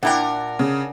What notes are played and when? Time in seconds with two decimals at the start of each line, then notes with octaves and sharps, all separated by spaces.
0.03 A#2 D4 E4 A#4 F#5 G5
0.59 C#3